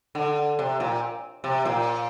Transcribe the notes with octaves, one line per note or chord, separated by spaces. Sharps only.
D3
C3
A#2
C3
A#2